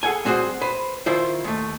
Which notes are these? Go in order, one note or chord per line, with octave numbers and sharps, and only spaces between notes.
G#4 A4 F#5 G#5
G3 C4 F#4 G#4 C5
B4 C5
D#3 E4 F4 C5
D#2 A3